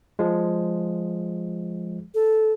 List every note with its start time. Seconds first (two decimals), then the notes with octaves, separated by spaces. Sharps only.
0.19 F3 G#3
2.15 A4